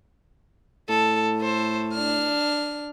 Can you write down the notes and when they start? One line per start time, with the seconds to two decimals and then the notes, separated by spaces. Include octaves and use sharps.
0.89 A2 A4
1.39 A4 C5
1.93 D4 F6